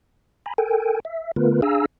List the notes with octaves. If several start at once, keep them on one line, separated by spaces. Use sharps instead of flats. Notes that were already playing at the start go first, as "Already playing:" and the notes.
G#5 A#5 B5
A4 A#4 G5 G#5
E5
D3 A3 B3 F4 A#4 B4
D4 G#4 F5 G#5 A#5 E6